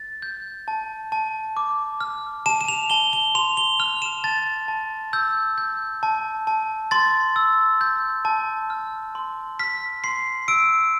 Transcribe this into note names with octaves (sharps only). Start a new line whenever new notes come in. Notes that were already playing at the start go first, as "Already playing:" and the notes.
Already playing: A6
G6
A5
A5
D6
F6
A5 E7
E7
F7
A5 G7
G7
C6 F7
G7
F6 F7
E7
A5 A6
A5
E6 G6
G6
A5
A5
C6 A6
E6
G6
A5
F6
C6
F6 B6
C6 C7
E6 D7